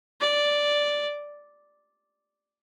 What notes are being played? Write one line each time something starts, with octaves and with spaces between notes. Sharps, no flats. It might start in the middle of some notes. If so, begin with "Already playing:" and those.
D5